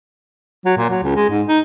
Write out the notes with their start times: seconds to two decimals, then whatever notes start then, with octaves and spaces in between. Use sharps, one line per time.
0.65 F#3
0.77 A#2
0.90 F#3
1.03 C#2
1.16 G#3
1.30 G#2
1.48 D#4